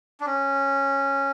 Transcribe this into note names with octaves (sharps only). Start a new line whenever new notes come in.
D4
C#4